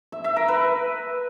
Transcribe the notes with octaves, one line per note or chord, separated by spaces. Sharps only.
E5
E5
A#4
B4